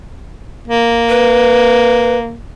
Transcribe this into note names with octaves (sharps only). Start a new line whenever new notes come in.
A#3
B4